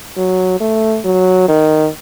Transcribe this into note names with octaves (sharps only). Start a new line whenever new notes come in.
F#3
A3
F#3
D#3